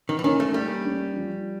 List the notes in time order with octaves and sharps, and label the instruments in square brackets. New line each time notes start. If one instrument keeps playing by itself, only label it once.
[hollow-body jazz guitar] D#3
E3
[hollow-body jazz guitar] D#3 [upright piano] C#4
[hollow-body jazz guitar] A3
[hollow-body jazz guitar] G3 [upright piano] A#3
[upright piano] C#4
F3